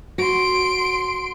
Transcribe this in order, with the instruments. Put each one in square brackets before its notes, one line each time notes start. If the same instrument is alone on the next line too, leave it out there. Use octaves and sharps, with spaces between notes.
[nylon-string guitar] F#4 [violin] C6 D7